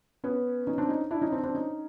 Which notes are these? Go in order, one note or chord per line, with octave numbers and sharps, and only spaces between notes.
B3 C#4
C#4 D#4
C4 D4
C#4 D#4
D4 E4
C#4 D#4
C4 D4
C4 D4
C#4 D#4